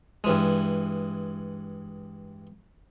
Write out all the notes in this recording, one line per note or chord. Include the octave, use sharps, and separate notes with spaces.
G2 E3 G#3